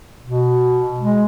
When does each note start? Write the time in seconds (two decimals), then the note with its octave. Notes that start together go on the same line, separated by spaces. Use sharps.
0.23 B2
1.01 G#3